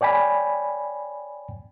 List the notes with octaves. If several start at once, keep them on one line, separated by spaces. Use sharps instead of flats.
C#5 D5 G5 G#5 B5